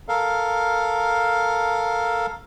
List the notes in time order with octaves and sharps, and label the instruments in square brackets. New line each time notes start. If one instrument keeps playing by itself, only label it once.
[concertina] A4 A#4 F5